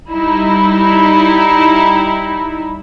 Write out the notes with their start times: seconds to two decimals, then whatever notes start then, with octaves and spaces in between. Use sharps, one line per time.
0.12 G3 D#4 E4